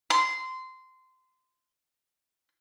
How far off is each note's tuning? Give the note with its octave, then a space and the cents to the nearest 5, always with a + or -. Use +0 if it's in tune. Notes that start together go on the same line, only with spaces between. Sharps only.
C6 -15